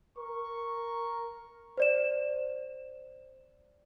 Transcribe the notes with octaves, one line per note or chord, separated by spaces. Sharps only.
A#4 C#6
C5 D5 E7